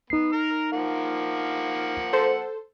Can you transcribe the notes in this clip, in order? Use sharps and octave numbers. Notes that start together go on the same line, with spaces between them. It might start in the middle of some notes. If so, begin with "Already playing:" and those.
B3 D#4 C7
A#5 F6
F3 A#3 F#5
A4 C5